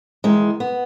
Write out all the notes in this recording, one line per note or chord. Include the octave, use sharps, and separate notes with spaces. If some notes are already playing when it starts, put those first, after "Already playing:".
E2 D#3 G#3
B3